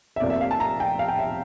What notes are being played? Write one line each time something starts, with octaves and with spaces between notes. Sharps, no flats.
E5
F1 F2 C3 F3 A#3 D5
E5
F5
A5
A#5
G5
F5
G5
E5